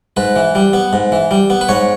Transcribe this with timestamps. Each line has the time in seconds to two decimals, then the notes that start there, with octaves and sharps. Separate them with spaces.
0.17 G#2 B4
0.36 E3
0.55 G3
0.73 B3
0.93 G#2
1.12 E3
1.31 G3
1.50 B3
1.61 B4
1.69 G#2 C#5